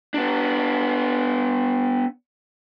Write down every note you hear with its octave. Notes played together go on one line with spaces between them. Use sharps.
B3 D4